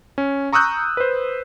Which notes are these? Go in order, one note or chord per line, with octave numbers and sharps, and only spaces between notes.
C#4
A#5 C#6 D#6 E6 F#6 G6
B4 C5